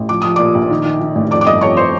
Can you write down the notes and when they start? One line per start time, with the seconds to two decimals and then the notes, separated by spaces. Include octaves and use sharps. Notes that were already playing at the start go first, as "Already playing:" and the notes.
Already playing: A1
0.09 F3 D6
0.22 F3 D#6
0.36 A#2 D5 D6
0.55 A#1
0.70 D#3
0.85 D#3
1.01 D#3
1.15 A1
1.31 F2 D5 D6
1.41 D6
1.47 G1 D#5 D#6
1.61 F2 C#5 C#6
1.77 C5 C6